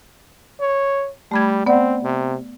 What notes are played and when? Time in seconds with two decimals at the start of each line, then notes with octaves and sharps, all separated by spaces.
0.60 C#5
1.31 G3 A3 B5 G#6
1.66 B3 C4 D5 F#5
2.03 C3